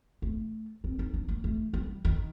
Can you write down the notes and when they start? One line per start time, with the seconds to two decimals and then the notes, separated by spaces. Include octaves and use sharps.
0.22 A3
0.84 C4
0.99 D#4
1.14 D4
1.28 A#3
1.44 A3
1.74 G3
2.05 D#3